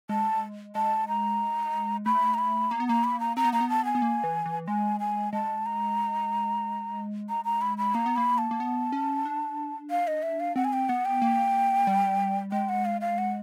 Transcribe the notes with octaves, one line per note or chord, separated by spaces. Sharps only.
G#3 A5
G#3 A5
A#5
A3 B5
A#5
B5
A#3 A#5
B3
A#3 A#5
B5
A#5
C4 A#5
B3
A#3 A#5
B3
A5
G#5
B3
A#3
E3
E3
G#3 G#5
G#5
G#3 A5
A#5
A#5
A#5
B5
B5
A#3 A#5
B3
A#3 B5
A5
A#3
B3
C#4
D4
F5
D#5
E5
F5
C4 F#5
G#5
G5
B3 F#5
G5
A#3
G3
G#3 G5
F#5
F5
F5
F#5